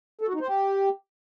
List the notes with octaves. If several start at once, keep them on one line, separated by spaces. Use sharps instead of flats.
A4
F#4
D#4
C5
G4